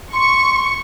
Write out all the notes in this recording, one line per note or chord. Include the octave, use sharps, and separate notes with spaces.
C6 C#6